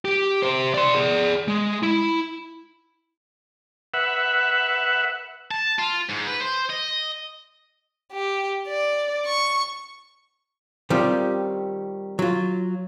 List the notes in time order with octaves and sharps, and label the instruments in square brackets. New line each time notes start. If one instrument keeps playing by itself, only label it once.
[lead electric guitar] G4
G4 C5
D5 C6
G#4 D5
G#3
E4
[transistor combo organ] B4 E5 F#5
[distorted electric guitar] A5
F4
G#2
B4
C5
D#5
[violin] G4
D5
C#6
[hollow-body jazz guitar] D#3 G3 C4 C#4 F4 G4
F#3 F4